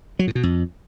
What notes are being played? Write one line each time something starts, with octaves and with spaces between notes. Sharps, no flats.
F#3
A2
B2
F2